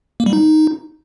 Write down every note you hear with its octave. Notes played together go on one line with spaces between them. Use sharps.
A#3
G3
D#4